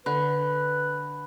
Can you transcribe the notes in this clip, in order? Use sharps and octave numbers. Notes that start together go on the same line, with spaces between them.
D3 B4 B5 F#6